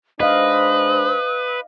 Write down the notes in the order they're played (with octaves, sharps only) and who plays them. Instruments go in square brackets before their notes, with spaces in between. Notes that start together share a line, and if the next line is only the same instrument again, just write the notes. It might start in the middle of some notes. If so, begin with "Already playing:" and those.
[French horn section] G#3 D4 C5 [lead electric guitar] B4 [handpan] D#5 F5 [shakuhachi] D#6